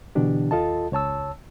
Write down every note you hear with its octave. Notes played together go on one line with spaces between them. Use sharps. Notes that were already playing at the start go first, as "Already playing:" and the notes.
B2 D3 E3 D4 G4
D#2 F4 A4 D#5 A5
C#2 C#5 A5 E6